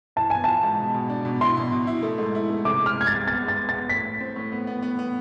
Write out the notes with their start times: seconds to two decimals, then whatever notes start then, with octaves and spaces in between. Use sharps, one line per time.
0.16 E3 A5
0.30 B3 G#5
0.44 F4 A5
0.63 G#2
0.79 B2
0.94 B2
1.10 D4
1.25 B2
1.41 E4 C6
1.57 B2
1.72 B2
1.87 E4
2.03 A3
2.18 G#2
2.35 E4
2.50 A3
2.65 C3 D6
2.81 G#3 F6
2.96 G#3 G#6
3.07 A6
3.12 C2
3.27 B3 A6
3.43 G#3
3.48 A6
3.59 B3
3.69 A6
3.74 B3
3.89 A2 B6
4.05 A2
4.20 C4
4.36 A2
4.52 B3
4.67 B3
4.82 B3
4.99 B3